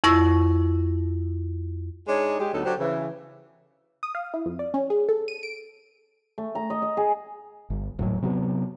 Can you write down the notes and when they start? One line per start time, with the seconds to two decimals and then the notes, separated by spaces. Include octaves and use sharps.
0.04 F2 E4 C#6 E6 A#6
2.08 G#3 D4 D#4 C#5
2.39 G#3 G4
2.53 D2 F#3 B3 D#4 A4
2.65 F#3 D4 G4 A4 C5
2.80 C#3 E3
4.03 D#6
4.15 F5
4.34 E4
4.46 F2
4.59 D5
4.74 C#4
4.90 G#4
5.09 A4
5.28 D#7
5.43 D7
6.38 A3
6.55 A#5
6.70 D#5
6.82 D#5
6.97 G#4
7.70 G1
7.99 D#1 A2 F#3
8.22 C3 F#3 G#3 B3